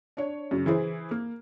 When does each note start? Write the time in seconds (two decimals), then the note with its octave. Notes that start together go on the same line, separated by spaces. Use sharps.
0.17 D4 C#5
0.51 F#2 C#3
0.66 E3 E4 G#4 C5
1.11 A#3